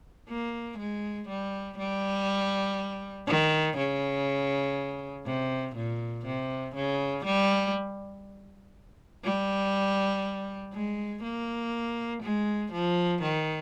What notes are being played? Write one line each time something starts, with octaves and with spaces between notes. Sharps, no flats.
A#3
G#3
G3
G3
D#3
C#3
C3
A#2
C3
C#3
G3
G3
G#3
A#3
G#3
F3
D#3